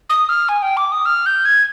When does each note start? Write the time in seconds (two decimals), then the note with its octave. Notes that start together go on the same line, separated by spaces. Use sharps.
0.09 D#6
0.29 F6
0.49 G#5
0.62 G5
0.77 D6
0.92 D#6
1.05 F6
1.26 G6
1.45 G#6